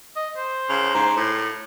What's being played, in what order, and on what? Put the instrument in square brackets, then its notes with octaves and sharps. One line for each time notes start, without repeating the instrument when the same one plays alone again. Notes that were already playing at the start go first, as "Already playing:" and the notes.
[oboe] D#5
C5
[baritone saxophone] C#3
G#2
A2